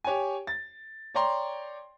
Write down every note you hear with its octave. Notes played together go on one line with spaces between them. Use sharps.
G4 C#5 G5 G#5
A6
C#5 D5 G5 A#5 C6